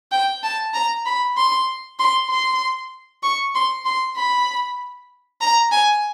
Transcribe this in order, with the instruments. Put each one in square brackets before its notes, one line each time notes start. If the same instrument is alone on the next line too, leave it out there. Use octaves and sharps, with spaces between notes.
[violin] G5
A5
A#5
B5
C6
C6
C6
C#6
C6
C6
B5
A#5
G#5